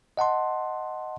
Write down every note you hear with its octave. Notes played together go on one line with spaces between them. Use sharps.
D#5 F#5 A5 C6